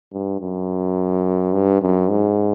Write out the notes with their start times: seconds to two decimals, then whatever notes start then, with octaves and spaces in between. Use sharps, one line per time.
0.13 G2
0.40 F#2
1.53 G2
1.81 F#2
2.10 G#2